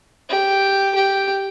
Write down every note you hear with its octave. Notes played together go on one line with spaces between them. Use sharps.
G4
G4